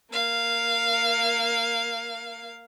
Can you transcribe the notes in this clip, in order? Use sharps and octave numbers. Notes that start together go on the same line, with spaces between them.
A#3 F5